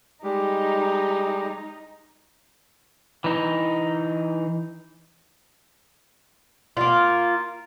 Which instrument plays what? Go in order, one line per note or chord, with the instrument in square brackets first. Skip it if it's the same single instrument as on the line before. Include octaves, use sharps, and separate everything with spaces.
[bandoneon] G3 G#3 G4 [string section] D#4
[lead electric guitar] E3 D#4
[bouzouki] A#3 F4